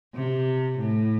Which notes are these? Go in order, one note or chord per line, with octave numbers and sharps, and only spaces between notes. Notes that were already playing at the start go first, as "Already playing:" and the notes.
C3
A2